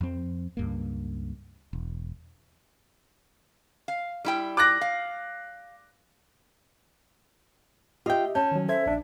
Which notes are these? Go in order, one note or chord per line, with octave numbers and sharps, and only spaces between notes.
F2 F3 C4
C#2 G2 A#3
E1
F5
G3 E4 G5
D6 F#6 A#6
F5
F4 G4 D#5 E5 G5
C#4 A5 G6
D#3 F#3
A4 C5 E5 G#6
A#1 D4